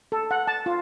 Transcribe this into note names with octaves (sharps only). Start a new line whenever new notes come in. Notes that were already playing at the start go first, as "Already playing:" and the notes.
A4
F#5
A5
F4